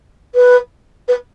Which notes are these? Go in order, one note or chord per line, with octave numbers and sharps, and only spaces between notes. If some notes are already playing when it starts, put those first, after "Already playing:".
B4
B4